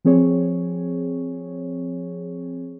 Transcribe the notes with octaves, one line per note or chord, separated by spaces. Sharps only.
F3 C4 G#4 C#5